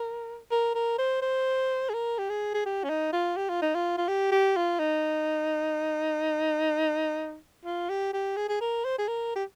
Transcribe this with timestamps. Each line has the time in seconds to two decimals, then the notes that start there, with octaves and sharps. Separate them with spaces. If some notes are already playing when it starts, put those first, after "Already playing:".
Already playing: A#4
0.51 A#4
0.75 A#4
0.98 C5
1.22 C5
1.89 G#4
1.94 A#4
2.18 G4
2.29 G#4
2.54 G#4
2.66 G4
2.84 C#4
2.89 D#4
3.13 F4
3.37 G4
3.49 F4
3.62 D#4
3.74 F4
3.97 F4
4.08 G4
4.32 G4
4.56 F4
4.79 D#4
7.65 F4
7.89 G4
8.13 G4
8.36 G#4
8.49 G#4
8.61 A#4
8.84 C5
8.98 G#4
9.08 A#4
9.35 G4